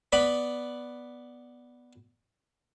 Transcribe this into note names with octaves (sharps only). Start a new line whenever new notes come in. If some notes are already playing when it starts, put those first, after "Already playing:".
B3 B4 D5 B5